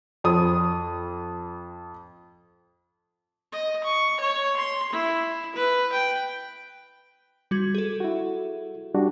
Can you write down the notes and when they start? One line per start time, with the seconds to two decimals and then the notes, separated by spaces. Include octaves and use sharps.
0.24 F2 D#6
3.52 D#5
3.84 C#6
4.20 C#5
4.57 C6
4.92 E4
5.55 B4
5.92 G5
7.51 G3 F#4 G#6
7.75 G#4 A4
8.00 E4 F#4
8.95 G3 D4 F#4